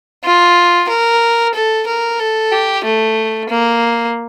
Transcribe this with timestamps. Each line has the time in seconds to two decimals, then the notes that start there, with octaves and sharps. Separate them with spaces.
0.24 F4
0.89 A#4
1.55 A4
1.87 A#4
2.20 A4
2.52 G4
2.85 A3
3.49 A#3